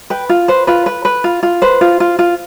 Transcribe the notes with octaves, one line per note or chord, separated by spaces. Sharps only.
B4 G5
F4
B4 C5
F4 B4
B4
B4
F4
F4
B4 C5
F4
F4
F4